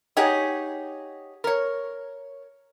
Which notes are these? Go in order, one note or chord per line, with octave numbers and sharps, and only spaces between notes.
D#4 G4 G#4 C#5 F#5
A#4 C#5